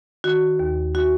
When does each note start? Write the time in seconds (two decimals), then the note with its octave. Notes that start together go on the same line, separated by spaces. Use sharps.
0.24 D#3 F#4
0.59 D#2
0.95 F#4